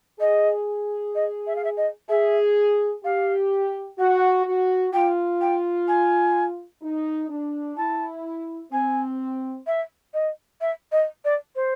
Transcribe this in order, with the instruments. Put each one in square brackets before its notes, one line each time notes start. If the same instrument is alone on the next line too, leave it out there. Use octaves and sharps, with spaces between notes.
[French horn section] G#4 [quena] D#5
[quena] D#5
E5
F5
E5
D#5
[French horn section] G#4 [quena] E5
[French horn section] G4 [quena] F5
[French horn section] F#4 [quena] F#5
[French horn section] F#4
[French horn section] F4 [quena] G5
[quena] G5
G#5
[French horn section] D#4
D4
[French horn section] E4 [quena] A5
[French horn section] C4 [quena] G#5
[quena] E5
D#5
E5
D#5
D5
C5